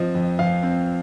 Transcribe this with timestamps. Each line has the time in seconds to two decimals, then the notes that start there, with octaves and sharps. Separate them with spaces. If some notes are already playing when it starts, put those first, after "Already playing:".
Already playing: F3 C4 D#5
0.15 F2
0.39 F2 F5
0.63 C4